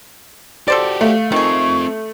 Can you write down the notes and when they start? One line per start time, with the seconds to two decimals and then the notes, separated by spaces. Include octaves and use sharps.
0.68 F#4 G4 A4 C5 D5
1.01 A3 F5
1.32 D#3 C4 F4 G#4 C#6